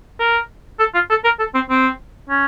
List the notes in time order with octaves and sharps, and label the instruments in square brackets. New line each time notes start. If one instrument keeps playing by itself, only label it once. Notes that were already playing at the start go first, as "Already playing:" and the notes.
[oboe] A#4
A4
F4
A4
A#4
A4
C4
C4
C#4